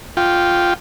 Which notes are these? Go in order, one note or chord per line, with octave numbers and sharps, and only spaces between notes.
F4 G5